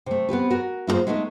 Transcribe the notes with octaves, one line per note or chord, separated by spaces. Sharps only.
C3 A3
B3 C4 G4 B4
F#4 A#4
A#3 E4 F4 G#4 C5
G#3 A3 B3 D4 D#4